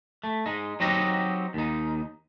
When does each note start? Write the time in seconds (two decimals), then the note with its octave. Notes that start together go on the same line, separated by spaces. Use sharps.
0.24 A3
0.46 G#3 D#4
0.80 F#3 C4 D#4 F#4 G4 D#5
1.54 D#2 D#4